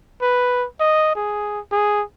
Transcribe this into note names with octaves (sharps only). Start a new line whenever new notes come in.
B4
D#5
G#4
G#4